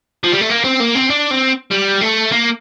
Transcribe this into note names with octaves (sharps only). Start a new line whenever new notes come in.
F3
G3
A3
A#3
C4
A#3
C4
D4
C4
G3
A3
A#3